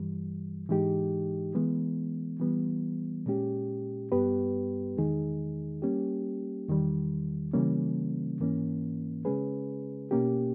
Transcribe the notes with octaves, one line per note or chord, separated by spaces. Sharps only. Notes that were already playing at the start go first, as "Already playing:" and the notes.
Already playing: G2 E3 G3
G#2 E3 G#3 D#4 G4
E3 G#3 B3
E3 G3 B3
A#2 G#3 C#4 G4
G2 G3 B3 G4 B4
E2 D#3 G#3 D#4 G#4
G3 A#3 C#4 G4
E2 D#3 G3
C#3 E3 G3 A#3 C#4
G#2 E3 A#3 C#4
C#3 G#3 C#4 G#4 B4
B2 A#3 C#4 G4